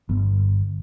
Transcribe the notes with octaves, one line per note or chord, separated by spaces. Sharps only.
G1